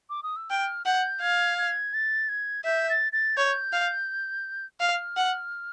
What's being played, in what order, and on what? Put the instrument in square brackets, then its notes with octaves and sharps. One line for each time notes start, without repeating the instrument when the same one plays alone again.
[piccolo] D6
D#6
E6
[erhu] G5 [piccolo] F6
[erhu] F#5 [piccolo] G6
[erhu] F5 [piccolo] G#6
[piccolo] G#6
A6
G#6
[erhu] E5 [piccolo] G6
[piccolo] A6
A6
[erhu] C#5 [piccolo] G6
[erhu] F5
[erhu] F5 [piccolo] F6
[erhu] F#5